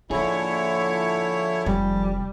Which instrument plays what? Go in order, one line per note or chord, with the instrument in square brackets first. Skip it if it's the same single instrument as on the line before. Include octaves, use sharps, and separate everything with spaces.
[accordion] D3 E4 C#5 [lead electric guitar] F3 G#4 [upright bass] A#3 F4
[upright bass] F1 [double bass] G3